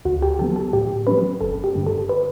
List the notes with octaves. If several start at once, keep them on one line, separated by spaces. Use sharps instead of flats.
D2 F#4
G4
D3 F#3 B3 A4
A4
A2 G4
F#3 A3 C#4 B4
G1 A4
G4
G2 D3 A3
A4
B4